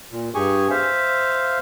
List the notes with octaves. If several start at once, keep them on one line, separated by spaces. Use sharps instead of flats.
A#2
G2 G4 G#4 G#5 C#6
C5 E5 F5